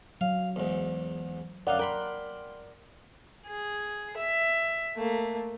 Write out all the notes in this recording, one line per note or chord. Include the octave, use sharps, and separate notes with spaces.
F#3 F5
E2 G#2
F#2 D#4 D5 F5 F#5
A#4 G5 B5 C6
G#4
E5
A3 A#3